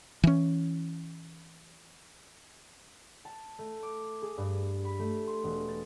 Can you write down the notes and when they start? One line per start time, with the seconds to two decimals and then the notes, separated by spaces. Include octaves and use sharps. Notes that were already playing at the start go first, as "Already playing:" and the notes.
0.24 E3 C#4
3.25 A5
3.59 A3
3.83 D6
4.22 G#4
4.38 G2
4.85 B5
4.99 A3
5.27 C6
5.44 E1
5.69 A6